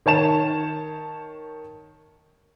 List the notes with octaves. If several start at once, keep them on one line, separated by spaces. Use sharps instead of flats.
D#3 C#5 A5 E7